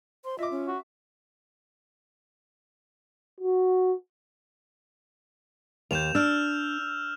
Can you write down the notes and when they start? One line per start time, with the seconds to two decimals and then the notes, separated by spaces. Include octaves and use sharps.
0.25 C5 C6
0.39 F4 D#5 E5 D6
0.51 C#4
0.67 F#4
3.40 F#4
5.91 D#2 G6 E7 F7
6.15 D4 E6 F6